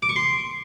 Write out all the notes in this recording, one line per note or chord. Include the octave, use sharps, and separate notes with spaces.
D6
C#6
C6